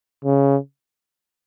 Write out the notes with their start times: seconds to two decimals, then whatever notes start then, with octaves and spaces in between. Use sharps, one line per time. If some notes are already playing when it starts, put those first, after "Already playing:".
0.24 C#3